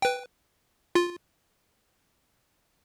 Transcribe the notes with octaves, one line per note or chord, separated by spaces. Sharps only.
B4 G5
F4